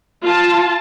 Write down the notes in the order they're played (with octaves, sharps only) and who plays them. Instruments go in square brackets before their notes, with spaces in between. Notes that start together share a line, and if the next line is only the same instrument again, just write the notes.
[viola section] F4 A5